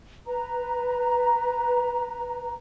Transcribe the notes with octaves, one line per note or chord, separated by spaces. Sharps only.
B4 A#5